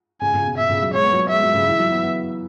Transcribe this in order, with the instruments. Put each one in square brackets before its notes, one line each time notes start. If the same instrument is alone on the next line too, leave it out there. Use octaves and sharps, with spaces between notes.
[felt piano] C#3 [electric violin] G#5
[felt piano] C#3
B2
[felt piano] B2 [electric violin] E5
[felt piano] C#3
F#3
[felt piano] G#3 [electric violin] C#5
[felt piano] B3
F#3
B3
[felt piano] G#3 [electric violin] E5
[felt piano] F#3
C#3
E3
F#3
B3
B3